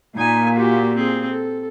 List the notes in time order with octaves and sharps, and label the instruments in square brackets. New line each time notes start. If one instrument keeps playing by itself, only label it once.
[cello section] A#2 [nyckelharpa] D#4 G#5
[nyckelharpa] F#4 G4
C4 G#4
A4